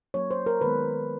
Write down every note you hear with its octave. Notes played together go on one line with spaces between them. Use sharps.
F#3 A#3 C#4 C#5
C5
A#4
D#3 G#3 B3 B4